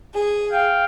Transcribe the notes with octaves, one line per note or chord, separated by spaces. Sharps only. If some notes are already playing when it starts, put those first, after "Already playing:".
G#4
F5 G5